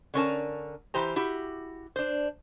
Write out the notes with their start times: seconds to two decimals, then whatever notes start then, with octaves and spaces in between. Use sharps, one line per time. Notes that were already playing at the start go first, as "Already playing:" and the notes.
0.14 D3 C#4 A#4 A5
0.94 E3 G4 C5 A#5
1.16 E4 F#4 G4
1.96 D4 C5